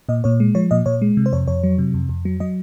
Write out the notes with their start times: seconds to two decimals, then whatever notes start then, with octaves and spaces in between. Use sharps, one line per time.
0.09 A#2 D#5
0.24 A#2 C#5
0.40 G#3
0.55 F3 C#5
0.71 A#2 D#5
0.86 A#2 C#5
1.02 G#3
1.17 C3
1.26 C5
1.33 F2 C#5
1.48 F2 C#5
1.63 F#3
1.78 C3
1.94 F2
2.09 F2
2.25 F#3
2.40 F#3 D#5